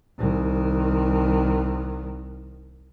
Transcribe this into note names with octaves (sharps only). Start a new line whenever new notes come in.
C2 D#3